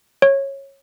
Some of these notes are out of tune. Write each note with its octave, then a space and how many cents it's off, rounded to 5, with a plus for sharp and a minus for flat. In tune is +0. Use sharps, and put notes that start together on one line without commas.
C#5 -15